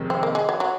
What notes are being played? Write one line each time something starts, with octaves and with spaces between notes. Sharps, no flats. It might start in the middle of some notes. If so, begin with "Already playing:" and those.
Already playing: F2 C3 D#3 G#3
C4
A#3
G#3
F#3
F#3